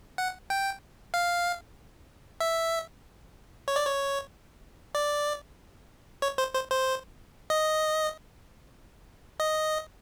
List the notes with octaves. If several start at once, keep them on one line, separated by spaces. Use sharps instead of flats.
F#5
G5
F5
E5
C#5
D5
C#5
D5
C#5
C5
C5
C5
D#5
D#5